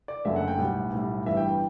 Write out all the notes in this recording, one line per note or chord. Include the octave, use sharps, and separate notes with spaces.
D5
F#1 F#2 D3 F#3 A3 E5
F#5
G5
B1 A2 G3 F#5
B1 A2 G3
G1 G2 E3 G3 E5
G5
G5